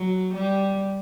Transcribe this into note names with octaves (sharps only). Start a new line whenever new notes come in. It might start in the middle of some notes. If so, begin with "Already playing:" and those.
Already playing: F#3
G3